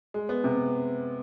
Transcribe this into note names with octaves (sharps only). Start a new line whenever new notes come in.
G#3
B3
C3